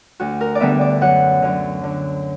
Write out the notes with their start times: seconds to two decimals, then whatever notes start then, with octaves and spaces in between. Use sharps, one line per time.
0.20 D2 F#4
0.41 A#4
0.55 D5
0.61 D3 G3 B3 E5
0.81 D5
1.01 F#2 F#5
1.42 D3 F#3
1.84 D3